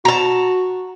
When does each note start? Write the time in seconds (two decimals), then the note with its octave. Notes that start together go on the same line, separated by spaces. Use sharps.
0.05 F#4 A5 A#5